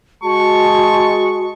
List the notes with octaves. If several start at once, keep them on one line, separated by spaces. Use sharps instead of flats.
G#3 F#4 A5 C#6